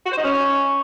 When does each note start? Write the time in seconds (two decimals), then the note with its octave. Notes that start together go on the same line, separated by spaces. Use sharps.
0.06 F#4
0.12 C5
0.18 D#4
0.23 C#4